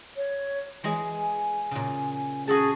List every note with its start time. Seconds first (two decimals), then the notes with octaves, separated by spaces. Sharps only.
0.17 C#5
0.84 E3 G#3 G#4 G#5
1.71 A#2 C#3
2.47 C#4 F#4 G#4 A4 A5